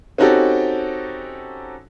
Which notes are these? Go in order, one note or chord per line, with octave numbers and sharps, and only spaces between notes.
C4 C#4 D#4 F#4 G4 A4